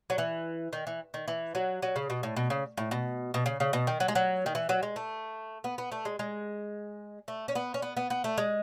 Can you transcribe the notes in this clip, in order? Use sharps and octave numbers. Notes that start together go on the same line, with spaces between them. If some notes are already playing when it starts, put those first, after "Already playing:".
F#3
E3
D#3
E3
D#3
E3
F#3
F#3
C#3
B2
A2
B2
C#3
A2
B2
B2
C#3
C#3
B2
D#3
F#3
G#3
F#3
D#3
E3
F#3
G#3
A3
B3
B3
A3
G#3
G#3
A3
C#4
B3
C#4
B3
B3
B3
A3
G#3